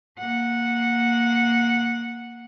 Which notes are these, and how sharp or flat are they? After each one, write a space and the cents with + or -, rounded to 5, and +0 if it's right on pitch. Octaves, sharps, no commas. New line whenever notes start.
A#3 +0 F#5 -10